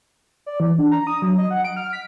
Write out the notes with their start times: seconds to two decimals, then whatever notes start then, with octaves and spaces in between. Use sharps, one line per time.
0.46 D5
0.60 E3
0.78 D4
0.91 A#5
1.07 D#6
1.22 F#3
1.38 D#5
1.50 F#5
1.64 D7
1.77 F6
1.93 B6